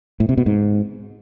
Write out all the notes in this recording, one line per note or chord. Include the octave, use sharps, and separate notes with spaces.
A2
C3
B2
G#2